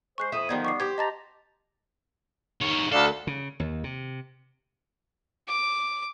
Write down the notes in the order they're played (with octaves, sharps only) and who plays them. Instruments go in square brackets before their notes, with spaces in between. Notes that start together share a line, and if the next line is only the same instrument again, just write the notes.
[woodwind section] G#3 C5 [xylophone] C#6 F#6 C7
[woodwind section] F2 D#6 [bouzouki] E4
[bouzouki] D3 D#3 F3 [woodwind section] G3 B3 [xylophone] G#6
[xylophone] C#6 D6 C7
[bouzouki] G4 C5 [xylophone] G#6
[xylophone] D#5 A5 A6 [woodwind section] A#5
[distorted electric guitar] D#3 C#5
[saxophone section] D2 D4 F5 [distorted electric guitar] A4
[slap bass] C#3
D#2
C3
[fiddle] D6